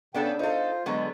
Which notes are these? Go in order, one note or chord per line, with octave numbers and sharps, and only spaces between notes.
C#3 B3 D4 A4 G5
D#4 F4 A4 C5
D3 F#3 G#3 B3